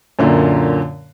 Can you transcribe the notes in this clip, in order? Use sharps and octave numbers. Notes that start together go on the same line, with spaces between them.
F#2 A#2 D3